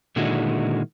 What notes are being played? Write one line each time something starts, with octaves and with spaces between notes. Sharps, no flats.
A#2 D3 D#3 G#3 E4 F#4